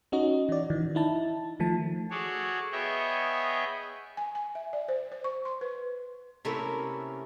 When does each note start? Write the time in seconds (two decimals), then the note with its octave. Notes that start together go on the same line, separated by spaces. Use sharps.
0.12 C#4 D#4 F#4 D#5
0.49 E3 D5
0.70 D#3 E3
0.95 D#4 E4 A5
1.60 D#3 F3 A3 A5
2.11 F#4 G#4 A4 C#5 D5
2.72 B3 G#4 C#5 D#5 E5 G5
4.17 G#5
4.35 G#5
4.55 E5
4.73 D5
4.88 C5
5.12 C5
5.24 C#6
5.45 C6
5.61 B4
6.45 C3 A3 A#3 C#4 E4